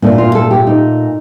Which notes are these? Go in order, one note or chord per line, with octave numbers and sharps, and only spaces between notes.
A#2 A3 D4
F4
A4
G4
D#4